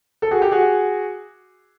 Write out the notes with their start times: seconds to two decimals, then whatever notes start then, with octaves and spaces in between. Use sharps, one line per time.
0.22 A4
0.31 F#4 G#4
0.42 G4
0.51 F#4 G#4